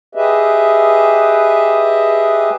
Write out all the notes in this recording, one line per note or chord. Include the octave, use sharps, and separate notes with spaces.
G4 G#4 B4 D#5 E5